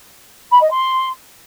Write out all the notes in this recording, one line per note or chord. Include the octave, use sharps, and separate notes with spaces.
B5
D#5
C6